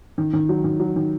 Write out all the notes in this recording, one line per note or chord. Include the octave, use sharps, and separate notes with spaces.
D#3
D#3
F#3
D#3
F#3
D#3